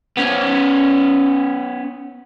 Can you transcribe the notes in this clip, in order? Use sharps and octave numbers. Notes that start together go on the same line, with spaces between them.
B3 C#4